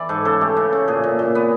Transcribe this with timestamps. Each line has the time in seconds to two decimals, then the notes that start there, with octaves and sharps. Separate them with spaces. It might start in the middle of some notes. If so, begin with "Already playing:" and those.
Already playing: E3 D5
0.09 G#2 A4
0.25 C#3 A4
0.41 A3 G4
0.57 C#3
0.73 C#3
0.88 A#2 G#4
1.04 A#2
1.19 A#2
1.35 B3